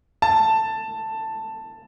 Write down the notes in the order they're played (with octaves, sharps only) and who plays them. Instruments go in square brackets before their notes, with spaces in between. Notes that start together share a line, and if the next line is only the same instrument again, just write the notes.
[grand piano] A5